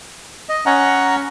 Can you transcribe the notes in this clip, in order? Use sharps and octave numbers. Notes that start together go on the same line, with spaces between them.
D#5
C#4 F#5 A#5